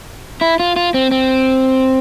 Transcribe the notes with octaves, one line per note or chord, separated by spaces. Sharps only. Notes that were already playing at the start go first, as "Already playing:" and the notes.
E4
F4
F4
C4
C4